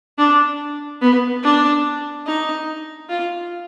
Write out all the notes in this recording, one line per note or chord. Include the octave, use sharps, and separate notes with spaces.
D4
B3
D4
D#4
F4